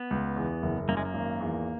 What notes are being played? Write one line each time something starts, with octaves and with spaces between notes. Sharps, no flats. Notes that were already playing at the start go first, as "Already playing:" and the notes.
Already playing: B3
C#2
E2
F#1
F#2 A#3
G#3
A#3
G#1
E2